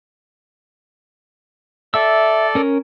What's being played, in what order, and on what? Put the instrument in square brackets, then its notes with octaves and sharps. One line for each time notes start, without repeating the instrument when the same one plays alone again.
[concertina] A4 D5 [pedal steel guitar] E5 E6
[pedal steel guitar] C#4 A#4